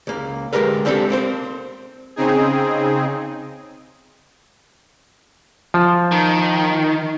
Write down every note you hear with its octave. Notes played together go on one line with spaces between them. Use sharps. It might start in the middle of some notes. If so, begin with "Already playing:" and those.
C#2 A#3
D2 D#3 G#3 G4 A#4 B4
A#3 C4 D4 E4 G4 A4
A#3 C4 C5
C#3 C4 D#4 G#4
F3
D#3